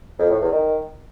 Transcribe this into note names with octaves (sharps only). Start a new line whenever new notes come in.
F2
A2
E2
D#3